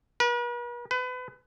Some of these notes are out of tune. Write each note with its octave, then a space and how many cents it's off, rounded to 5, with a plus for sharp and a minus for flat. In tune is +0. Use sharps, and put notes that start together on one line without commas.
B4 -45
B4 +30